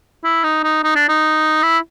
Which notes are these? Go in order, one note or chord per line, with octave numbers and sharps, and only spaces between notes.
E4
D#4
D#4
D#4
D4
D#4
E4